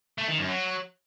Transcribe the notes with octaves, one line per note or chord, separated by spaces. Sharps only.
A3
D#3
F#2
F#3